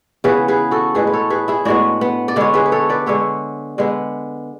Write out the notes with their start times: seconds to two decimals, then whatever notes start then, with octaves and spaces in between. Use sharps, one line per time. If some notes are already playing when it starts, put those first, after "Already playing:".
0.24 C#3 E3 B3 G#4 B4
0.48 G#4 B4
0.71 F#4 A4
0.95 A2 G#3 B3 G#4 B4
1.07 B4
1.13 A4 C#5
1.30 G#4 B4
1.48 E4 G#4
1.65 A2 G#3 B3 D4 F#4
2.01 B3
2.28 D5
2.36 D3 G#3 B3 C#5
2.54 G#4 B4
2.66 B4
2.72 A4 C#5
2.89 B4 D5
3.06 D3 G#3 B3 C#5 E5
3.78 D3 G#3 B3